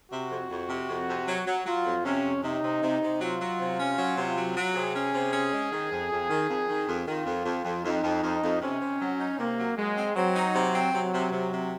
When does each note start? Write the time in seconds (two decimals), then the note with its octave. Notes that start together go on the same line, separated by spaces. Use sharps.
0.11 C3 F#4
0.31 F2
0.50 F2
0.69 C3
0.88 F2
1.09 C3
1.27 F#3
1.46 F#3
1.66 F#3 F4
1.86 F2
2.05 C3 C#4
2.24 F2
2.44 C3 D#4
2.63 C3
2.83 C3
3.01 C3
3.21 F#3 F4
3.40 F#3
3.60 C3
3.79 C#4
3.97 F#3
4.17 C3
4.37 F#3
4.56 F#3
4.75 C3 G#4
4.95 C#4
5.14 C3
5.33 C#4
5.53 G#3
5.72 D#3
5.91 F2
6.11 F2
6.30 D#3
6.49 F2
6.69 D#3
6.87 F2
7.07 D#3 F4
7.26 F2
7.45 F2
7.64 F2
7.84 F2 D#4
8.03 F2
8.23 F2
8.43 F2
8.61 C3 C#4
8.81 C3
9.01 F#3
9.19 D#4
9.39 C3 A#3
9.59 F#3
9.77 F#3 G#3
9.97 C4
10.16 F#3 C4
10.35 D#4
10.55 C3
10.75 C4
10.93 C3 F#3
11.13 C3
11.32 C3
11.52 C3